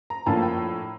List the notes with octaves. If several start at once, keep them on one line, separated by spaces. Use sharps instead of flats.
A#5
A2 F3 A#3 D4 A5
G5
A#5